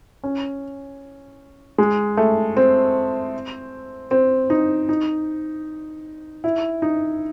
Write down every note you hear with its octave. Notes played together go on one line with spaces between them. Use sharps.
C#4
G#3
A3
C4
C4
D#4
D#4
E4
D#4